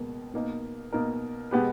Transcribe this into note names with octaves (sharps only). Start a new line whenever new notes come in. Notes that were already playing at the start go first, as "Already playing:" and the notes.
Already playing: C#2 B2 A#3
B2 A#3 D#4 A#4
B2 A#3 D#4 A#4
B2 G#3 B3 G4 B4